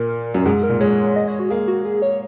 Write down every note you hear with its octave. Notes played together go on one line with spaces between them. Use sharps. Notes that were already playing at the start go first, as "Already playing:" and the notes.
Already playing: A#2 A#4
F#2
G#2 G#4
A#4
A#2
G#3 C#5
D#5
C#5
F#4
A#3 G#4
F#4
G#4
C#5